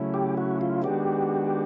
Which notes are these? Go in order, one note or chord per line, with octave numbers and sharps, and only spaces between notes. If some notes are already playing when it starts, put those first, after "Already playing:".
Already playing: C#3 F#3 A3 C#4 E4
G4
F#4
F4
D#3 G#3 B3 D4 F#4 G4